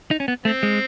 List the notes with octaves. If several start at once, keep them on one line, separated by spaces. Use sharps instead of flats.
D#4
C#4
B3
A3 C4
G#3